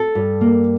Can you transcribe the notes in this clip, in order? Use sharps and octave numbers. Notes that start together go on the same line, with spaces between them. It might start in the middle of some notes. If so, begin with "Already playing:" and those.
Already playing: A4
G2
A#3